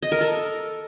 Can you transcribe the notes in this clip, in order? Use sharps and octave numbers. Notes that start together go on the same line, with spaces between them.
D#5
A#4
A4